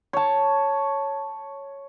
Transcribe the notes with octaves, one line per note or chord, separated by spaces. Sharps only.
C#5 A5